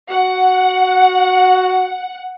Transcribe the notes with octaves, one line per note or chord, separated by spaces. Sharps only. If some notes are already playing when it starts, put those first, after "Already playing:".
F#4 F#5